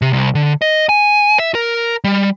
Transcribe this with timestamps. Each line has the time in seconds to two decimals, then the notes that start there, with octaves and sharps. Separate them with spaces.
0.02 C3
0.13 C2
0.35 D3
0.62 D#5
0.89 G#5
1.39 E5
1.55 A#4
2.04 G3